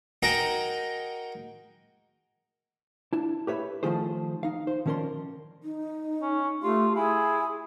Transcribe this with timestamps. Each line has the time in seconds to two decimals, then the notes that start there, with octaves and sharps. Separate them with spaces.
0.23 D#4 F#4 G#4 A#4 G5 A#5
3.13 D4 E4 A5
3.47 G4 B4 C#5 E5 B5
3.83 D#3 F3 A3 F4 G#4 C5
4.43 D#4 F5
4.67 C5
4.86 D#3 F3 C#4 A#4 D5 C6
5.63 D#4
6.22 C#4
6.63 A3 F4 G4
6.96 E4 G#4 G#5